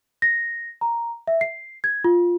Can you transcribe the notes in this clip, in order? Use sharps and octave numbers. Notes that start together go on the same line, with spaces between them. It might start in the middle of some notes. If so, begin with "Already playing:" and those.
A#6
A#5
E5
C7
G#6
F4